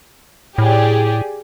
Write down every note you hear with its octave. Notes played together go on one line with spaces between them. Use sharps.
A2 G4 G#4 D5